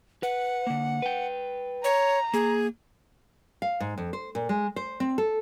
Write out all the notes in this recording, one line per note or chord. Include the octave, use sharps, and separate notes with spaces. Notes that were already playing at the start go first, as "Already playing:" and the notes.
B4 F#5
D3 A#3
B4 G5
C#5 A#5
A#3 G#4
F5
G#2
F2
C5
A#2
G#3
C5
C4
A4